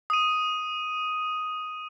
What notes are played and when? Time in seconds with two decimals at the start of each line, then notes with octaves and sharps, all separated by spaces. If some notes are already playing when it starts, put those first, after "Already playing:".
0.10 D#6 D#7